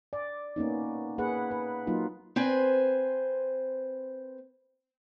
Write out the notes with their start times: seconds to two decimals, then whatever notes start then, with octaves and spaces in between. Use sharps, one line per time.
0.13 D5
0.56 A#3 B3 C#4 D#4
1.18 A#3 G#4 B4 F#5
1.51 B4
1.87 F#3 A#3 D#4 F4
2.36 C4 B4 C5 G#5